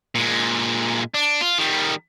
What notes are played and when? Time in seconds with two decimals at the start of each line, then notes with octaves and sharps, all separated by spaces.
0.15 A#2 G#3
1.14 D4
1.41 F4
1.58 D#3 G3